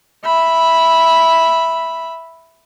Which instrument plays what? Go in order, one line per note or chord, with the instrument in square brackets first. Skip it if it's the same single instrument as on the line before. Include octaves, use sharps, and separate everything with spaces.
[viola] E5 B5